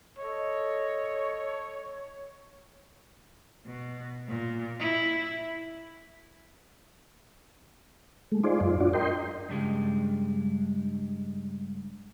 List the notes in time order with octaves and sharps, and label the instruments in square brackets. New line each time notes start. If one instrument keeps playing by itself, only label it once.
[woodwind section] A4 D#5 [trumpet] C#5
[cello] B2
A#2
E4
[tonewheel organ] G#3 A3
D#4 F4 G#4 C5 D5
F#2 F4
D4 F4 F#4 D5
A#4 D#5 G5 C6
[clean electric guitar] G2 C#3 G3 G#3